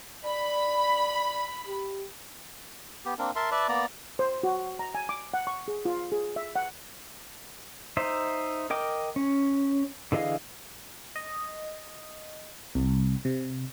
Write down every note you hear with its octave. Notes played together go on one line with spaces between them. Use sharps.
D5 B5
G4
B3 G4
A#3 C4 D4 A#4
A#4 E5 A5 C6
B4 D5 E5 A5
A#3 B3 D5 A#5
C5
F#4
A#5
G#5
D6
F#5
C#6
G#4
F4
G#4
E5
F#5
D#4 C5 E5
A#4 D#5 G5 D6
C#4
D3 E3 G#4 D#5 F5
D#5
C2
C3